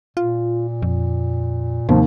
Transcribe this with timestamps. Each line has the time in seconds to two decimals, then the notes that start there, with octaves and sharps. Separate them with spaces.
0.17 A#2 F4
0.82 F2
1.89 D#2 C3 F3